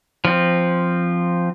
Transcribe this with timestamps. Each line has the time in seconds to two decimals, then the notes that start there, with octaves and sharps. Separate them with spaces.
0.25 F3 C4